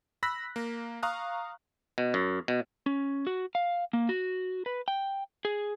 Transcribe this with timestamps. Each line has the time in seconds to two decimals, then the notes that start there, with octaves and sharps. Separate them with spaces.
0.23 B5 E6 F#6 A#6 B6
0.56 A#3
1.03 F5 A#5 C#6 D#6 F6 F#6
1.98 B2
2.14 F#2
2.48 B2
2.86 C#4
3.27 F#4
3.55 F5
3.93 A#3
4.09 F#4
4.66 B4
4.88 G5
5.45 G#4